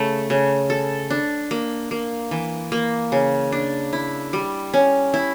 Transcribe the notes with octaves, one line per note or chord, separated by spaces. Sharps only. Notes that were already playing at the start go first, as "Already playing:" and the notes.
Already playing: C#3 A3
C#3
A4
D4
A#3
A#3
E3
A#3
C#3
D4
E4
G3
C#4
E4